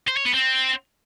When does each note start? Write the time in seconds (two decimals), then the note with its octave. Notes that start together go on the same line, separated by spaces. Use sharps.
0.08 C5
0.17 C#5
0.25 B3
0.34 C4